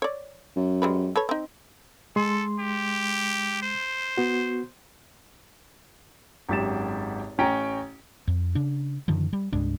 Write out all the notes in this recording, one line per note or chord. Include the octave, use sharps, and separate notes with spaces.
C#5 D5
F#2
G3 G#3 B4
A4 B4 C#5
C4 D#4
G#3 A4 C6
G4
C5
B3 F#4
G#1 F#2 G4 A6 E7
A1 C#4 G5 A#5
F2
C#3 D4
F#2 D3 D#3 F3
G3
C2 G2 G#3 D4